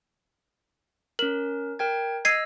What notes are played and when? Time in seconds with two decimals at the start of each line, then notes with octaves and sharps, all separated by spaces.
1.19 C#4 A#4 F#7
1.79 A#4 G5 G#6
2.25 D#5 E6 G#6 C7 D#7